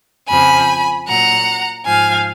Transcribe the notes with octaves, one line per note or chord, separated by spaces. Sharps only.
F2 C#3 F3 G#5 B5
A#2 F#3 F#5 A#5
G#2 F3 F5 G#5